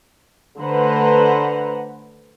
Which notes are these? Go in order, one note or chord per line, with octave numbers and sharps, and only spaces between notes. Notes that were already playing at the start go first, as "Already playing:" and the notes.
D3 A3 B4 C5 F#5 A#5